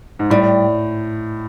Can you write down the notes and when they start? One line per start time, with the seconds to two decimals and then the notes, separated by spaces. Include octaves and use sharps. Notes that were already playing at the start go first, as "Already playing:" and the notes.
0.19 G#2
0.30 A2 G3